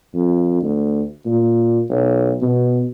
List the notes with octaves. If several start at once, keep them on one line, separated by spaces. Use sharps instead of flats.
F2
D2
A#2
B1
B2